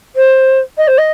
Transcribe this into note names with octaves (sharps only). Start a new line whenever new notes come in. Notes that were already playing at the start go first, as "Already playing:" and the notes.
C5
D#5
C5
D#5